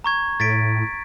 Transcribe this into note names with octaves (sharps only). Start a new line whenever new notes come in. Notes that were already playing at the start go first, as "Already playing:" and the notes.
A#5 C#6 G#6
A2 A6 B6 D7